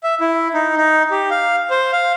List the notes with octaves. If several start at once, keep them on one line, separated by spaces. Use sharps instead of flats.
E5
E4
D#4
D#4
G4
F5
C5
F5